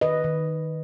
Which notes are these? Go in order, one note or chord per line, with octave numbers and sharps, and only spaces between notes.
D#3 B4 D#5
D#3